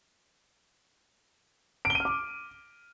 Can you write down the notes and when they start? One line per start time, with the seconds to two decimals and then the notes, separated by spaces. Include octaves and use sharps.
1.85 D7
1.90 G7
1.95 D#7
2.00 F6
2.05 D6